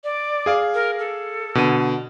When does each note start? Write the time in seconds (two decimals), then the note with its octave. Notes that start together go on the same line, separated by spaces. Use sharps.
0.04 D5
0.46 G#4 F5 D6
0.74 A#4
0.99 A4
1.55 B2 D3 D#7